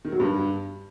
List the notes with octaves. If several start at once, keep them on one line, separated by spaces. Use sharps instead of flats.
D#3
F#3
G2